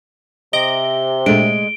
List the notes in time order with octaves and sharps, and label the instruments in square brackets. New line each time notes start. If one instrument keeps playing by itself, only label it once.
[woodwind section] C3 [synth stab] D#5 A#6 D7 [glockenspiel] G7
[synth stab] A#2 A3 D4 [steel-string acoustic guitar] G#3 [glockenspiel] D7